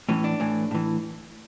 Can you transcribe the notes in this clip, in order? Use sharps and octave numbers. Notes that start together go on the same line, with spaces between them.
A2 E3 C#4
D4
A2 E3
A2 E3